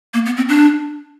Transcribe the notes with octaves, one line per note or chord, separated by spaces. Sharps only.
A#3
B3
C4
D4